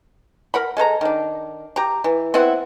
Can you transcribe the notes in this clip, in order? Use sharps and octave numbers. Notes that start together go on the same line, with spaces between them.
A#4 F#5 B5
G#3 A4 C5 A#5
D#3 D4
G4 A#5
E3
B3 C4 E4 F#5